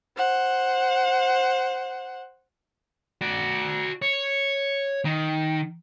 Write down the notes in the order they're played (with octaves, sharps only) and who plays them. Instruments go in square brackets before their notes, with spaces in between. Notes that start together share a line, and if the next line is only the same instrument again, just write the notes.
[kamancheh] C5 F#5
[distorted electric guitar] F#4 D5
C#5
D#3